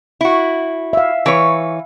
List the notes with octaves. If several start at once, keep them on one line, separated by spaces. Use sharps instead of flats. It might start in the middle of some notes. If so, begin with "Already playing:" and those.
E4 F#4
E5 F5
E3 B4 C#5